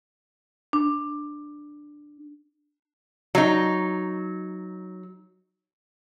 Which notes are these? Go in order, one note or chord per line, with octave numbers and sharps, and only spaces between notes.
D4
F#3 D#4